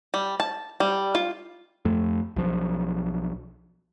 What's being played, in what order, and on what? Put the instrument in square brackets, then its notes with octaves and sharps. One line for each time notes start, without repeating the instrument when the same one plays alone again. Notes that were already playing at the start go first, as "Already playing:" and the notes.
[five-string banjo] G3
A5
G3
F4
[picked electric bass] F2 A3
B1 F3